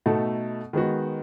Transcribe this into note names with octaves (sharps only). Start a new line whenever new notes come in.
B2 A3 D#4 A4
D#3 G#3 B3 F#4